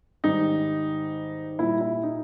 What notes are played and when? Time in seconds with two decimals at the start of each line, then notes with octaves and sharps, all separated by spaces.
0.24 G#2 D#3 G3 D#4
1.59 A#2 G3 E4
1.81 E4
2.03 D#4